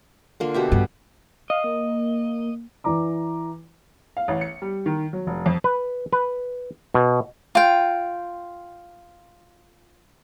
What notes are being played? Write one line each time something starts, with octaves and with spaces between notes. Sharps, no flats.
D3 A#3 F4
B2 G4 E5
G2 B3
D#5 F5
A#3
E3 D5 A#5 D6
F5
A1
C#7
G3
D#3
F#3
F1
F2
B4
B4
B2
F4 G5